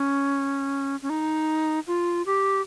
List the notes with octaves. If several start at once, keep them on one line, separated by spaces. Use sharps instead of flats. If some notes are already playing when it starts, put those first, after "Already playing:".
Already playing: C#4
C#4
D#4
F4
G4